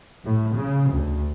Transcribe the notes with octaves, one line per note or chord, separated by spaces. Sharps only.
A2
C#3
D2